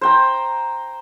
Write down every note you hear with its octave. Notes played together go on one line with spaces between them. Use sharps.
C5 G5 A#5